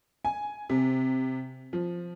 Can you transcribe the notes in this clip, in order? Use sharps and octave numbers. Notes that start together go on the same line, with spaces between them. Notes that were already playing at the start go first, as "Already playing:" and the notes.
G#5
C3
F3